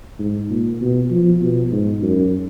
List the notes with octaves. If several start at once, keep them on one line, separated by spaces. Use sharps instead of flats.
G#2
A#2
B2
F3
B2
G#2
F#2